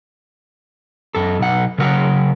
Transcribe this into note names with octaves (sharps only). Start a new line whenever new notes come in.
F#2 A4
B1 F#5
C#3 F#3 A#4 F#5